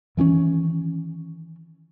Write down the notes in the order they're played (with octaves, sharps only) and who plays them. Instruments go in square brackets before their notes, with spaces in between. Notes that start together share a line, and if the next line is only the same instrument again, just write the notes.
[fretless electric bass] D#3 E3 C4 C#4